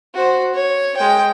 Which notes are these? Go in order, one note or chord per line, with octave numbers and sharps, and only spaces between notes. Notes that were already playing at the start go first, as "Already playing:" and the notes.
F#4 C5
C#5
G#3 G5